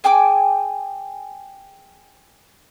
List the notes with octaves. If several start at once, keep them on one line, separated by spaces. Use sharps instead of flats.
G#4 G5 G#5 D6